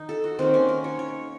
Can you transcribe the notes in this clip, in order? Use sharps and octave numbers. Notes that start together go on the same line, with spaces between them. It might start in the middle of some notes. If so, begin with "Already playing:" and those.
Already playing: D#3 D#4
A4
F#4
D#3 A#3 C4
C#4
A#4
C#5
C#5